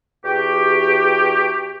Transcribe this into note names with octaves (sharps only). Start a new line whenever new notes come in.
E2 F#4 G4